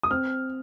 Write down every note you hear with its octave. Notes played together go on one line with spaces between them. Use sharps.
D#6
C4 F6